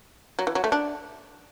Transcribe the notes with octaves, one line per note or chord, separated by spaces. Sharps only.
F#3
E3
F#3
A3
D4